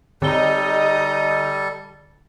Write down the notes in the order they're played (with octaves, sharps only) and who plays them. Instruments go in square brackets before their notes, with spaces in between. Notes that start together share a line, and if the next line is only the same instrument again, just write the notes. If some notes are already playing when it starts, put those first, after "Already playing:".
[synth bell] D3 G7 [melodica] G3 A4 [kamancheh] D#4 D#5